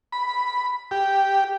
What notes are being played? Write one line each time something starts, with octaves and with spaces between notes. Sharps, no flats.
B5
G4